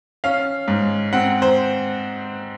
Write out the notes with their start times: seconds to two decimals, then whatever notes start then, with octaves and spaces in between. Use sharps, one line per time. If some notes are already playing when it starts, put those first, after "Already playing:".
0.24 C#4 F5
0.68 G#2
1.13 C4 F#5
1.42 C5